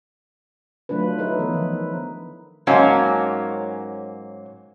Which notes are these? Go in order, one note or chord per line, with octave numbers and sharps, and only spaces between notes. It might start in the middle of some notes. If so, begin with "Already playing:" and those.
F#3 A3 D4 F4 B4
D#4 E4 A4 B4
E3 F3 B3
D#3
G#2 F#3 A#3 C#4